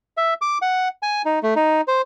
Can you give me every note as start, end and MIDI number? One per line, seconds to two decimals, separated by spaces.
0.17 0.34 76
0.41 0.58 86
0.62 0.88 78
1.03 1.22 80
1.25 1.39 63
1.43 1.54 57
1.56 1.81 63
1.88 2.02 72